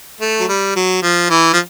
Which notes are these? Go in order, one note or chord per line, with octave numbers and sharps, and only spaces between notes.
A3
F#3
G3
F#3
F3
E3
F3